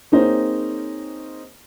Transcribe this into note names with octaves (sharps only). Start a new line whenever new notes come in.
A#3 C4 D#4 G#4 C5 C#5